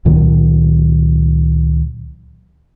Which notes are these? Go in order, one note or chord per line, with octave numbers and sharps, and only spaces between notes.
C#2 A#2 D#3 F#3